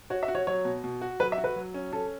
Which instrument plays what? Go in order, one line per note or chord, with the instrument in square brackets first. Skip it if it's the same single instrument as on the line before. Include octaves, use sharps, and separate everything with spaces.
[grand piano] F#4 [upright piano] C#5
[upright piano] E5
[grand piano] F#4
[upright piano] C#5
[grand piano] F#3 [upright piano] C#5
[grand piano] B2
B2
F#4
[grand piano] F#3 [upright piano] B4
[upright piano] E5
[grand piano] F#4
[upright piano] B4
[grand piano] F#3
C#4
[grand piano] C#4 [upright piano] A4